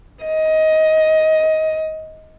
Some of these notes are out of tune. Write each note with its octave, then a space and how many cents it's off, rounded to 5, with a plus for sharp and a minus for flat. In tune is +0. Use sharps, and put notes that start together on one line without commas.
D#5 +15